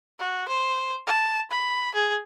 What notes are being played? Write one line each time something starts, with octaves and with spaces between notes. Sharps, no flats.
F#4
C5
A5
B5
G#4